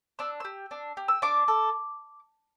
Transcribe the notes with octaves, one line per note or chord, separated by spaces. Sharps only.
D4 E6
G4 E6
D4
G4
E6
D4 D6
A4